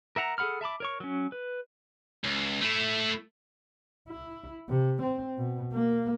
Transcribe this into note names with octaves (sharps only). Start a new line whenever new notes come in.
A#4 E5 F#5 A#5
G#4 A4 F#5 B5 F6
E5 A5 B5 D6
A#4 C#5 C#6
F#3 C#4
B4
C#2
A3 E4
E4
C3
C4
B2
A#3